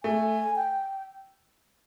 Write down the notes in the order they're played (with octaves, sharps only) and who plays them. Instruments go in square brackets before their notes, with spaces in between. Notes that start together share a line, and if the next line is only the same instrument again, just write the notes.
[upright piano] A3 [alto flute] G#5
[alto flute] G5